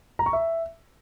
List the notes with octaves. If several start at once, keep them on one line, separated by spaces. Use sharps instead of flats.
A#5
C#6
E5